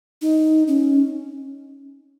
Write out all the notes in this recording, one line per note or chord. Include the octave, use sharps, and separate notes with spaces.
D#4
C#4